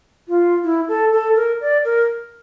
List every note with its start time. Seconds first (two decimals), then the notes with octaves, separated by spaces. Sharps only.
0.28 F4
0.64 E4
0.89 A4
1.12 A4
1.36 A#4
1.61 D5
1.85 A#4